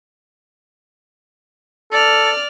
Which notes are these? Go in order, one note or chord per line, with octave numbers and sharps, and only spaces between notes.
A4 D5 F6